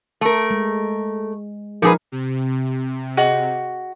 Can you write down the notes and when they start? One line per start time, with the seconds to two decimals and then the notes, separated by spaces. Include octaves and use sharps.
0.21 A3 A#4
0.51 G#3
1.82 A#2 F3 D#4 G#4 A#4 B4
2.12 C3
3.17 F#4 G#4 D#5 F#7